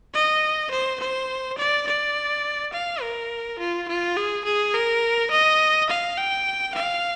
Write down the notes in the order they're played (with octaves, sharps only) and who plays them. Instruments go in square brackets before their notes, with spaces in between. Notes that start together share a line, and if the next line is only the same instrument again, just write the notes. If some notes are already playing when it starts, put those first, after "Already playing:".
[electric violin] D#5
C5
C5
D5
D5
F5
A#4
F4
F4
G#4
G#4
A#4
D#5
F5
G5
F5